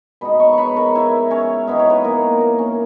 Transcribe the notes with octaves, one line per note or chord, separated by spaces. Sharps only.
B2 G#3 D#4 B4 B5
C#5 C#6
C#6
B4 B5
A#4 A#5
E4 E5
C#4 C#5
E3 B3 D#4 B4
C#5
B3 B4
A#3 A#4
A#3 A#4
C#4 C#5